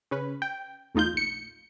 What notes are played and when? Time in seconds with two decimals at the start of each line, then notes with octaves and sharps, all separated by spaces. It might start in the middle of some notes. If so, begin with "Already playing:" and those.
0.11 C#3 C#4 B4
0.42 G5
0.95 E2 A3 D#4 F4 G6
1.14 A#1 C#7